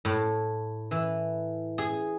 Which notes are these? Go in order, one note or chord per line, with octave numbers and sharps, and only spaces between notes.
A2
E3
G#4